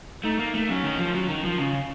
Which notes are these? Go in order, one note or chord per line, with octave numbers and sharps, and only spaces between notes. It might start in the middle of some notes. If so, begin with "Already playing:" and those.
A3 D#4
A#3
A3
F#3 C#4
D#3
F3
F#3
D#3
F3
C#3